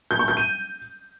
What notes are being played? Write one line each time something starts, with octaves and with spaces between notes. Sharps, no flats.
G6
C#6
G6
D#7